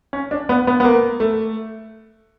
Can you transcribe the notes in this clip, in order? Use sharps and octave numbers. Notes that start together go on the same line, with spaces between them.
C#4
D4
B3
B3
B3
A#3
A3